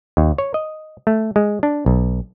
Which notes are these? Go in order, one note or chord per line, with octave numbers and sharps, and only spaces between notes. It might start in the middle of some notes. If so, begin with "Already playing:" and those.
D#2
C#5
D#5
A3
G#3
D4
B1